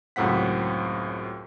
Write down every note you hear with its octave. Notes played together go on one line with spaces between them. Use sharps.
C#2 F#2 A2 C4 F#5 B6